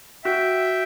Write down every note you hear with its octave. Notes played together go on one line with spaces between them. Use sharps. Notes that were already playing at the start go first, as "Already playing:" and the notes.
F#4 E5 G5